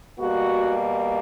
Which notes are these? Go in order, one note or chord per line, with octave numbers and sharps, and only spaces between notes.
B2 G3 A#3 F#4